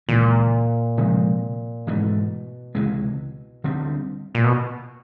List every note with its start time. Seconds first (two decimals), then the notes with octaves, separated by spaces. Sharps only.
0.09 C#2 A#2 C#3 E3
0.97 C3 F3 G#3 C4
1.86 G#2 B2 E3 A3
2.75 C#2 C3 E3 G#3
3.64 D2 D3 G3 C4
4.17 G#2
4.26 A2
4.35 A#2
4.44 B2